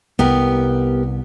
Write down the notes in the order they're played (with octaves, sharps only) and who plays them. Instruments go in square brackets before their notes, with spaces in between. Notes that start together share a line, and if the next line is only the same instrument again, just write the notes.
[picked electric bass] C2 [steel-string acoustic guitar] B3 G4 A#4